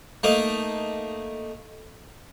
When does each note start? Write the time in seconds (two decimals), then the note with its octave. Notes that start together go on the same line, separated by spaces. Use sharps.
0.23 A3 A#3 D#4